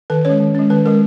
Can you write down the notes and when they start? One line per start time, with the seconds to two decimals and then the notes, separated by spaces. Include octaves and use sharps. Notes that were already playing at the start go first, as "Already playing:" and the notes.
0.10 D#3 B4
0.25 G#3 C#4 C#5
0.40 D#3
0.55 G#3 C#4
0.70 D#3 B4
0.85 G#3 C#4 A#4